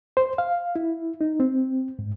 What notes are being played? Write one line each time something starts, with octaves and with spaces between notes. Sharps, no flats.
C5
F5
E4
D#4
C4
G#2